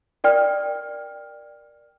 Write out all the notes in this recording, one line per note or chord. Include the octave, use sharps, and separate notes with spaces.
A#4 D5 G5 F6